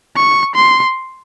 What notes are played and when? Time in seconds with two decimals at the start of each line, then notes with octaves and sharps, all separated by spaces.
0.17 C#6
0.55 C6